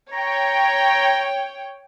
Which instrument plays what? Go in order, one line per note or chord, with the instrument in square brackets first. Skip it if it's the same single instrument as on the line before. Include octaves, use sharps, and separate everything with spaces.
[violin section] C#5 G5 [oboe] A#5